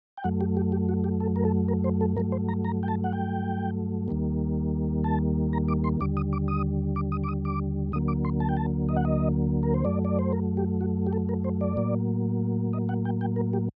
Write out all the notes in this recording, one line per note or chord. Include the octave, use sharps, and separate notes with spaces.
G5
F#2 F#3 A3 F#5
G4
G4
G4
F#4
G4
A4
A#4
A4
A#4
C5
A4
G2 F#3 A3 A#4
C5
A#5
A#5
G5
A5
F#5
G5
D#2 D#3 G3 A#3
A5
A#5
D6
C6
D#2 D3 G3 D6
D#6
D6
D#6
D6
D#6
D6
D#6
D6
D2 D3 F#3 A#3 D#6
D6
C6
A5
G5
A5
D#5
F#5
D#5
A#4
C5
F#2 F#3 A3 D5
D5
C5
A#4
G4
F#4
G4
A4
A#4
C5
D5
A2 F#3 A#3
D#5
F#5
G5
G5
A#4
G4